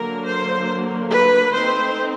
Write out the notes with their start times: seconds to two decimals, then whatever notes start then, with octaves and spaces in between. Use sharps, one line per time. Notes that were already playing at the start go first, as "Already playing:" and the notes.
Already playing: D3 F#3 A#3 A#4
0.27 C5
1.12 B4
1.55 A3 C4 D#4 C5